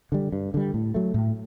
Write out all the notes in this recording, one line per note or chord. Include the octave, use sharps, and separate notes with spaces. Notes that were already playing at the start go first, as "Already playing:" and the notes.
D3 G3
G2
D3 G3
A2
F#3 A3
A2